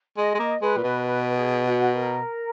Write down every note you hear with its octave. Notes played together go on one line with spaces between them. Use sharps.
G#3 D#5
G#3
A#3
G#3 B4
A#2
B2
B4
G#4
F#4
A#4